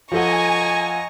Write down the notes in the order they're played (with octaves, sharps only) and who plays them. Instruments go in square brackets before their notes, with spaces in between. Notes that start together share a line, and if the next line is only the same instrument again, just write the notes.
[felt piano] F3 A4 F#5 [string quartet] D#5 A#5 C#6 [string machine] G#5